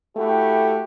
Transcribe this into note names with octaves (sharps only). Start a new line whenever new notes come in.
A3 E4 F#4 G4